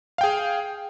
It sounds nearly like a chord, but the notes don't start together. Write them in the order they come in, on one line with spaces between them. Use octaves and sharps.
F5 G5 G#4